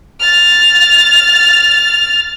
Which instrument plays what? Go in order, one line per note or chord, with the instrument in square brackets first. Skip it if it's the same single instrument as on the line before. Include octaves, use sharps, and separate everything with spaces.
[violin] F6 A6